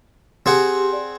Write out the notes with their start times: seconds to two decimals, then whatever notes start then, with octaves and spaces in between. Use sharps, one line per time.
0.46 C4 G4 G#4 F#5
0.93 D5